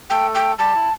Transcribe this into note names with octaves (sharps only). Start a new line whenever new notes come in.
A3 A4 G5
G5
G3 G4 A5
E4